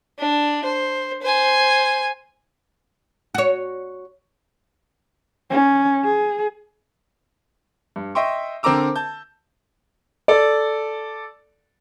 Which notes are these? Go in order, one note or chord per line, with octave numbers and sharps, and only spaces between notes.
D4
C5
C5 G#5
F#4 C#5
C#4
G#4
G2
D#5 E5 G5 C6 C#6
D3 C4 A#4 A#5 D6 E6
A5 G6
A4 D5